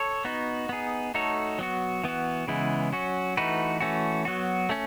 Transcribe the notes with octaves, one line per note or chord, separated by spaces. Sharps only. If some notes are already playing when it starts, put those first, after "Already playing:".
Already playing: A4 C#5
B3 D#4 F#4
B3 D#4 G#4
A3 D#4 F#4 A4 C#5
F#3 B3 F#4
E3 B3 F#4
C#3 E3 G#3 B3 E4
F#3 C#4 F#4
E3 A3 D#4 F#4 B4
E3 A3 C#4 F#4
F#3 B3 F#4
A3 C#4